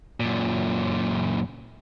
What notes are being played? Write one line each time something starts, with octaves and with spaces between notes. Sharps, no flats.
F#2 A#2